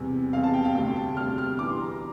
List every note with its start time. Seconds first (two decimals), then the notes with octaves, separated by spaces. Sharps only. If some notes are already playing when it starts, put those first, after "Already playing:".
Already playing: E2 C3 G3
0.33 E2 C3 G3 F5
0.43 A5
0.54 G5
0.64 F5
0.75 D2 C3 G3 G5
0.96 A5
1.17 D2 C3 G3 F6
1.38 F6
1.59 G2 E3 G3 D6
1.70 C6
1.81 A#5
1.91 A#5